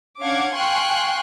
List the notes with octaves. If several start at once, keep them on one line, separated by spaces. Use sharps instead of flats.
C#4 D4 F5 F#5 D6 G#6
F5 G5 G#5 C6 C#6 F#6